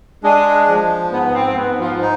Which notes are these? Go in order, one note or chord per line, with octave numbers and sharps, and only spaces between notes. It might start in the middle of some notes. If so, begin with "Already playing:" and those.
G#3 D4
F3
G#2 B3
C4
G#2 B3
F3
D#4